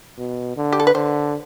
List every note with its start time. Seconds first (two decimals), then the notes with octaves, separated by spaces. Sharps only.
0.18 B2
0.57 D3
0.73 G4
0.80 A4
0.87 B4
0.95 D3 C5